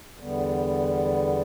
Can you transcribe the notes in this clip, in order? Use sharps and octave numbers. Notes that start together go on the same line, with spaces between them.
E2 D3 G3 B3